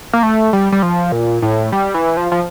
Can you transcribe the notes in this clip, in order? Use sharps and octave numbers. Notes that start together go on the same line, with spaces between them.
A#3
A3
G3
G3
F3
A#2
A2
G3
E3
F3
F3